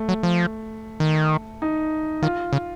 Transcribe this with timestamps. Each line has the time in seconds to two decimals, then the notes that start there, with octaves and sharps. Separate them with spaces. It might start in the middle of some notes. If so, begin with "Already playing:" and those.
Already playing: A3
0.09 F#3
0.23 F3
1.00 D#3
1.62 D#4
2.22 D#3 F4
2.53 C#3